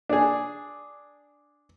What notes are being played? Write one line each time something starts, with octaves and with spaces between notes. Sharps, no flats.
D4 G#4